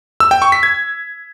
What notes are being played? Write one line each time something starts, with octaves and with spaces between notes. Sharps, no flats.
E6
G5
C#6
B6
G#6